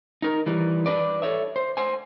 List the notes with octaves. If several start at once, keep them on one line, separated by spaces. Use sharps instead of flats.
D#4 A#4
E3 G3
D4 B4 D5
A4 C#5 E5
C5
C5 G#5